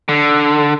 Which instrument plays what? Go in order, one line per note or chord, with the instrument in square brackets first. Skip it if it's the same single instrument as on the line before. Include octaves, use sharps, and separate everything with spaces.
[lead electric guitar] D3